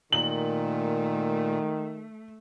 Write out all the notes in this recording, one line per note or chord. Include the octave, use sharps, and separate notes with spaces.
A#2 D#3 A3 F#7